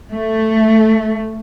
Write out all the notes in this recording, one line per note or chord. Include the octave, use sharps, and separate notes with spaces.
A3